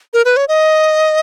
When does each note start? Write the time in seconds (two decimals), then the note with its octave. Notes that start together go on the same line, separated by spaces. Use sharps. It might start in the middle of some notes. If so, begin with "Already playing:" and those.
0.14 A#4
0.25 B4
0.37 C#5
0.48 D#5